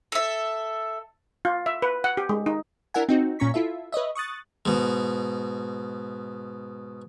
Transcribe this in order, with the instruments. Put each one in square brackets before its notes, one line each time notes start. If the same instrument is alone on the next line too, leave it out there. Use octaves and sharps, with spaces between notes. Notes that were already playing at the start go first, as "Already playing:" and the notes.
[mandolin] A4 E5
[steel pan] F4
E5
B4
F#5
G4
G#3
D#4
[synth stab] D4 E4 A#4 E5 F#5 G#5
C4 D#4 F#4
A#2 C#4 A#5 C#6 B6
E4 F4 A4 E5
B4 C#5 D#5 E5
C#6 D#6 F#6 A6
[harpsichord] G#2 B2